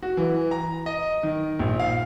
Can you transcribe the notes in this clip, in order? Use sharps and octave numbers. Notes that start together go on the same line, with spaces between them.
F#4
E3
A#5
D#5
D#3
A#1
F5